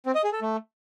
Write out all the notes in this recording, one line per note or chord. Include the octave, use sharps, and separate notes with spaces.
C4
D#5
G#4
A4
A3